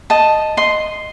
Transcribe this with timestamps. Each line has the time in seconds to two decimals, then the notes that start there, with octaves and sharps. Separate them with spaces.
0.10 D#5 A5
0.57 D#5 C6